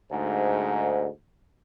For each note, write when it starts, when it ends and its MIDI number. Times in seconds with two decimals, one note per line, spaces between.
0.11 1.07 38
0.11 1.07 44